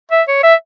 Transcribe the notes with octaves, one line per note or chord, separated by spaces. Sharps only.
E5
C#5
E5